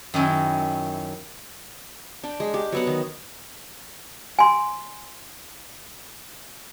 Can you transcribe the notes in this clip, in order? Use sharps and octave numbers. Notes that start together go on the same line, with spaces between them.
F#2 D#3 C#4 E4
D4 G5
G#3
G4
F#3 B3 F#5
D#3
G#5 C6